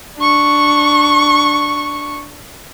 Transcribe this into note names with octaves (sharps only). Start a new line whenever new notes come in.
D4 C#6